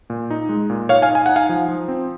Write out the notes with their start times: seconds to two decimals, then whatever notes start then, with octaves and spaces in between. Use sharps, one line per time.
0.10 A#2
0.31 D#4
0.49 G#3
0.70 A#2
0.89 D#4 C#5 F5
1.02 F5 G#5
1.09 D#4
1.15 G#5
1.26 D#4 F#5
1.36 F5 G#5
1.49 F3
1.68 F3
1.88 C4